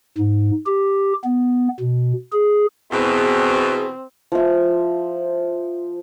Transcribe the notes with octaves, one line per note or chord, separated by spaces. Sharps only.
G#2
G4
B3
B2
G#4
E2 B2 C4 G#4
F3 C5 E5